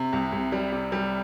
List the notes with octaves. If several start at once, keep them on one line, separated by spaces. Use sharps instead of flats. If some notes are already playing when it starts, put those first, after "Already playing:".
Already playing: C3
C2
C2
G3
C3
G3